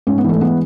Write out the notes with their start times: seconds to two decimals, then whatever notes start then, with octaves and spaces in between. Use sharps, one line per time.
0.07 G#2 C#4
0.18 B3
0.24 E3 A3
0.41 G#3 B3